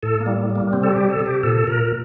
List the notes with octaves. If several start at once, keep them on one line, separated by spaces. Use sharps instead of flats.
A2 A4
A#3
G3
G3
A#3
C3 C4
A4
G4
C3
A4
C3
G4
A#2 A4
A#2 A#4